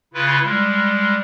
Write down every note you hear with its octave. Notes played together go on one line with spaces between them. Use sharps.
C#3 E4 F4 B4
G3 G#3